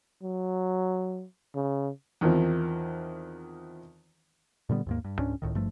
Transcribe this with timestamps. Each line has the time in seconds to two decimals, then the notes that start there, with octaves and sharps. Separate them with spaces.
0.23 F#3
1.55 C#3
2.21 E2 D#3 F3 C4
4.69 A#2 D3 G3 B3
4.86 D#2 G#2 A#3
5.04 G2
5.19 C#2 G#2 C#4 D4
5.42 C#2 A2 D#3
5.55 G#1 G2 F3 A3